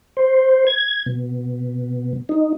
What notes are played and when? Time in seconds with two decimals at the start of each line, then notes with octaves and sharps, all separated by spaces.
0.17 C5
0.67 G#6
1.06 B2
2.29 D#4